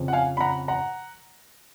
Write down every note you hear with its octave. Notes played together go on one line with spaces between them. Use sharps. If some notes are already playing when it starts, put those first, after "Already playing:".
Already playing: F2 C#3
F#5
F5 G#5
B5
F#5 A#5
F#5 A#5